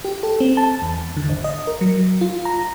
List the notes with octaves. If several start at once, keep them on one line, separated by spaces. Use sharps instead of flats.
G4
A4
C4
A5
E2
D3
G#1
D#5
A#4
F#3
F4
A#5